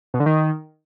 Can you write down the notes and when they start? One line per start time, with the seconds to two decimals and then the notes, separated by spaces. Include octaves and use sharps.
0.14 B2
0.20 D3
0.26 D#3